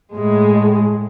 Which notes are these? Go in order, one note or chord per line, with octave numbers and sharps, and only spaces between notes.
A2 G#3